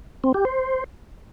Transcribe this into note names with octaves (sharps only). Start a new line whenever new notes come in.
C4
G4
C5